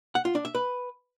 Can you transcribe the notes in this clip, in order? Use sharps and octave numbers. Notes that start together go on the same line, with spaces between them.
F#5
F4
D4
E5
B4